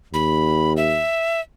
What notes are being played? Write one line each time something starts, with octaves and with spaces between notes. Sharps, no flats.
D#2 B5
E5